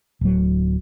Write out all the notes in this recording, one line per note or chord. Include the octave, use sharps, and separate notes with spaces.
D1 F#3